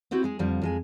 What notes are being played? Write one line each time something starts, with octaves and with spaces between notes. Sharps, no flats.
B3 C4 E4 F#4 G4
G#3 G#4
F2 D3 F3 G3
F2 G#3 G#5